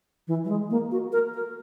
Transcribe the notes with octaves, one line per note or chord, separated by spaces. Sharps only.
E3
F#3
G#3
A#3
F#4
A#4
A#4